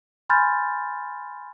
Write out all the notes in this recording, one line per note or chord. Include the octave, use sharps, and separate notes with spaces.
G#5 B5 C6 F6 G6 A6